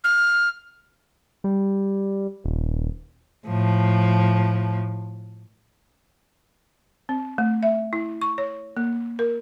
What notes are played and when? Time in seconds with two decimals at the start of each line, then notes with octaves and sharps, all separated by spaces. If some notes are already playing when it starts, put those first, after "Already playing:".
0.04 F6
1.44 G3
2.44 D#1
3.47 A2 F3
7.09 C4
7.38 A3
7.63 E5
7.93 E4
8.22 C#6
8.38 C#5
8.77 A#3
9.19 A#4